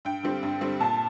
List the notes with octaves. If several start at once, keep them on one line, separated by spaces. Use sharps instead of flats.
G2 G5
D3 G3 C4
G2
D3 G3 C4
A#2 A5